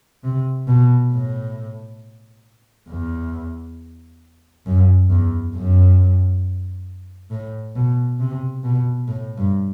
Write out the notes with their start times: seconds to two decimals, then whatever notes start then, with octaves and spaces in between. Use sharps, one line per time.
0.24 C3
0.68 B2
1.12 A2
2.89 E2
4.66 F#2
5.10 E2
5.54 F#2
7.30 A2
7.76 B2
8.20 C3
8.64 B2
9.08 A2
9.37 G2